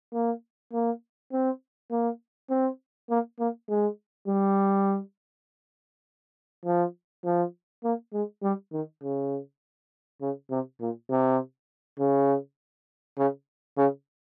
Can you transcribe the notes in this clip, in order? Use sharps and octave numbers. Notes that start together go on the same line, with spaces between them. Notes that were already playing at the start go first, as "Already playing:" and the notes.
A#3
A#3
C4
A#3
C4
A#3
A#3
G#3
G3
F3
F3
A#3
G#3
G3
D#3
C#3
C#3
C3
A#2
C3
C#3
C#3
C#3